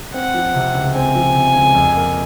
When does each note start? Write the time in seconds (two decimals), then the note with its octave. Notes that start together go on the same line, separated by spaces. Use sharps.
0.13 C4 F#5
0.34 F3
0.54 C3
0.75 C#2
0.95 C4 G#5
1.15 F3
1.34 C3
1.56 C#2
1.75 F2
1.95 A#3